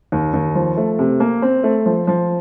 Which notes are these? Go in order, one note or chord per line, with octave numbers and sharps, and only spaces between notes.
D#2
D#2
F3
A3
C3
A#3
C4
A3
F3
F3